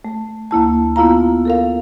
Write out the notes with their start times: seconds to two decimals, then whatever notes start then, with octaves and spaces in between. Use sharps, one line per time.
0.05 A3
0.51 D2 A#3 E4 A5
0.96 B3 E4 F4 F5 A#5
1.45 A4 A#4 F5